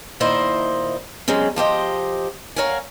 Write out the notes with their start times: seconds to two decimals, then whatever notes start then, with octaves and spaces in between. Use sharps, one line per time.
0.20 A#2 D#3 E4 C5 D#5
1.28 F#3 G#3 C4 C#4
1.56 F3 G4 C5 D#5
2.56 A#4 C#5 F5 F#5 G#5